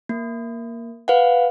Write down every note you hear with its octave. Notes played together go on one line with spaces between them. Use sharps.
A#3
B4 F5 F#5